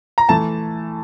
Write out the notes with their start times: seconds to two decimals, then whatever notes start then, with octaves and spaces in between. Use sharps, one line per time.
0.18 A#5
0.29 E3 A3 A5